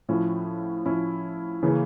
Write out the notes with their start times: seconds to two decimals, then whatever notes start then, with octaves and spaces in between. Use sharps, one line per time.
0.09 A2 F3 C#4 E4
0.86 A2 F3 C#4 E4
1.63 C#3 E3 A#3 C#4